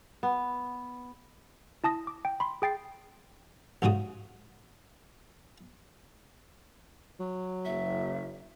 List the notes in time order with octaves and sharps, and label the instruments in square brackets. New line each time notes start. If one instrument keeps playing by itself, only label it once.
[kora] B3
[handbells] E4 A5 D#6 A#6
D6
G5
B5 C6
G#4 G5 A6 C7
[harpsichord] A1 G#2 C#3 F#4 D#6
[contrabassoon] F#3
[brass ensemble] F#1 [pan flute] E5